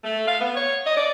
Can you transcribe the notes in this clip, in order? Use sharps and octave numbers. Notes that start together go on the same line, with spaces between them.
A3
F5
B3
C#5
D#5
D5